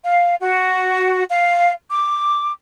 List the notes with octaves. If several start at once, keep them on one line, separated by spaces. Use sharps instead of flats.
F5
F#4
F5
D6